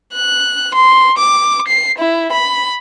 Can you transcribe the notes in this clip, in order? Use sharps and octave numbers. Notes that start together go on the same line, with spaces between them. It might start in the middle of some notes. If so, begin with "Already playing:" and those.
F#6
C6
D6
C7
E4
B5